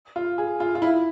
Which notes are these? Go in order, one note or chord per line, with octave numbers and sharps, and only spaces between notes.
F4
G#4
F4
F4
E4